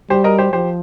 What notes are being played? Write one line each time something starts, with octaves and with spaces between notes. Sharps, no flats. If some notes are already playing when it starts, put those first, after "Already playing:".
G3 G4 C5
A#4 D#5
G4 C5
F3 G4 C5